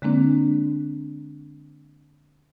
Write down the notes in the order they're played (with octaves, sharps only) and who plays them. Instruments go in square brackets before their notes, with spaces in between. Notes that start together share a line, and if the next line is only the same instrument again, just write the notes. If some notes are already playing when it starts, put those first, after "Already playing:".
[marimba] D3 G#3 A#3 C4 D4